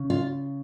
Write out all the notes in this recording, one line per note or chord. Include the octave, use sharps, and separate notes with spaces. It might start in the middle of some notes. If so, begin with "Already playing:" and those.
Already playing: C#3
F4